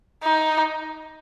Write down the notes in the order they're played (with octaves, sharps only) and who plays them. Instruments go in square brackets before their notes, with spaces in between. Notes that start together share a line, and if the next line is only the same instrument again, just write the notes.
[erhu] D#4